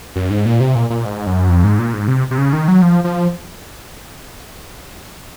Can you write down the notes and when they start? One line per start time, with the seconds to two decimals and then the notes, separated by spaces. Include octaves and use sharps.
0.16 F#2
0.30 G#2
0.46 A#2
0.60 C3
0.75 A#2
0.90 A#2
1.05 G#2
1.27 F#2
1.49 F2
1.64 G#2
1.79 A#2
1.93 G#2
2.08 C3
2.31 C3
2.38 C#3
2.53 D#3
2.68 F#3
2.82 F3
3.04 F3